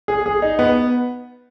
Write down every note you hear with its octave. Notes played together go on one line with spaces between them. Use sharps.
G#4
G#4
D#4
B3